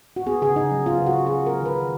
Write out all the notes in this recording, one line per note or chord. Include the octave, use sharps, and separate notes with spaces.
F#4
B3 G#4
C#3 G#4
C#3 D#4
F#3
B3 F4
C#3 F#4
C#3
F#3 G#4
B3 A#4
D#3 B4
D#3